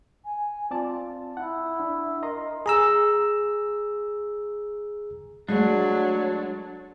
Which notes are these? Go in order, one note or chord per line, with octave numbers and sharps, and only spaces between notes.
G#5
C4 F4 D5 A5
E4 F#5
D4
A#4 D#5 A#5 C6
G#4 A#5 E6
F#3 G#3 A3 D4